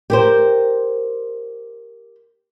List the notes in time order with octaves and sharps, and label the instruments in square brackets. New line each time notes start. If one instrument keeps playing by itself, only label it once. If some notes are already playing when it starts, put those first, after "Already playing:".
[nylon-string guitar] G4 A#4 C5